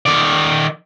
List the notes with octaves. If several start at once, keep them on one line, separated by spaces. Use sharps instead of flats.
D#3 D5